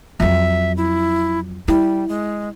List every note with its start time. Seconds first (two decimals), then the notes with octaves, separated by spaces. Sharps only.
0.20 F2 F#3 E5
0.77 E4
1.68 G3 E4
2.08 G#3